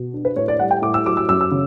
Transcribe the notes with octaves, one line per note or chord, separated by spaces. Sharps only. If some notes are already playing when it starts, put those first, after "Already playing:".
Already playing: B2
D4
B4
A2 C#5
D5
G3 F#5
G5
A2 D6
E6
F#3 D6
E6
F#2 E6
E6
C#3